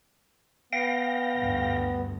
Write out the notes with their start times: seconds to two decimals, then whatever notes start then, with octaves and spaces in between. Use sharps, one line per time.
0.73 B3 F5 G5 A#6
1.37 D2 G2